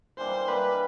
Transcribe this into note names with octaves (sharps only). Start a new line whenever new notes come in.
E3 G3 A#3 D4 C5
E3 G3 A#3 D4 B4